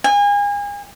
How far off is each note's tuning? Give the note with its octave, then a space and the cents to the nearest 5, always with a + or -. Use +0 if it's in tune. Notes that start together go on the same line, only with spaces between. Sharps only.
G#5 -35